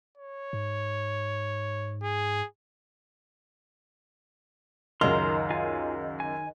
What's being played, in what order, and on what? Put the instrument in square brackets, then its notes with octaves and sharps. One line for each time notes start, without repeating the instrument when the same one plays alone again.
[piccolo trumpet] C#5
[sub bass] G#2
[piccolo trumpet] G#4
[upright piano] C#2 F#2 [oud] D#3 [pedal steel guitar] A#5 C6 F6
[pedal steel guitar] F4 F5 G#5
G#5